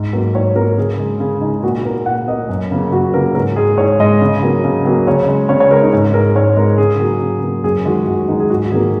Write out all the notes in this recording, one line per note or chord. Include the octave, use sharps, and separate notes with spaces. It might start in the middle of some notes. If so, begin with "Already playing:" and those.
Already playing: G#2
F#3 A#3 A#4
G#2 C#5
F#3 A#3 A#4
C#3 G#4
G#3
C#3 G#4
G#3 D#4
A#2 F#4
A#3 A#4
A#2 F#5
A#3 D#5
F#2
C#3 A#3
F#2 F#4
C#3 A#3 A#4
G#2 A#4
G#3 G#4
G#2 C#5
G#3 D#5
C#3
F#3 A#3
C#3
F#3 A#3
C#3 C#5
G#3
C#3 C#5
C#5
G#3 A#4
D#4
G#2
G#3 A#4
G#2 C#5
G#3 A#4
C#3 G#4
F#3 A#3
C#3
F#3 A#3
F#2 G#4
D#3 G#3 F#4
F#2 F#4
D#3 G#3 D#4
G#4
G#2 F#4
D#3 F#3 A#3 G#4